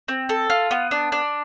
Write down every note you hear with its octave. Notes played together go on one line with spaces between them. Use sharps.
C4
A4
F4
B3
D4
D4